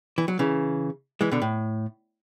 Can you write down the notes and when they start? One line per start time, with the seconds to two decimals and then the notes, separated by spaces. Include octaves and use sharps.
0.18 E3
0.28 F#3
0.39 C#3 E3
1.21 E3 G#3
1.31 B2 D3
1.42 A2